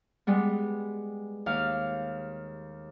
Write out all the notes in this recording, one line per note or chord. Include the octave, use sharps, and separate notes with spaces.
G3 G#3 B3
D#2 F5